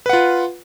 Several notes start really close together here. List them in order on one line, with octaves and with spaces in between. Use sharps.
B4 F#5 F4